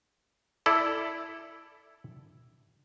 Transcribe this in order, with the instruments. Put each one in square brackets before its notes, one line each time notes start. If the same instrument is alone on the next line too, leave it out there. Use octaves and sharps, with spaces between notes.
[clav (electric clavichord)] E4 A4 D5